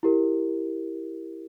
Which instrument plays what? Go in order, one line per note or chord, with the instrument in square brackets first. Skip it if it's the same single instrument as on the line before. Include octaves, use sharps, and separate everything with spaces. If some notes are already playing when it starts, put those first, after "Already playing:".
[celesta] E4 G4 A#4